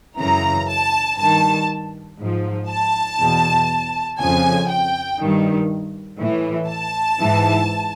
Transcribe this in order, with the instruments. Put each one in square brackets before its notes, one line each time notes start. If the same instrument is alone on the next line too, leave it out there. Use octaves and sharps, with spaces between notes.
[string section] F#2 C#3 E3 A#5
A5
G2 D#3 A5
G#2 F3
A5
E2 B2
F2 C#3 F3 G#5
G5
G2 D#3
A2 E3
A5
G#2 E3